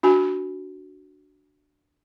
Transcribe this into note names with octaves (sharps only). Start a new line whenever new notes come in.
D4 F#4 G#5